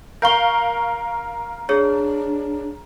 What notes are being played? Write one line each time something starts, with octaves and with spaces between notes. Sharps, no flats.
A#4 F5 C#6 G6 G7
D4 G#4 C#5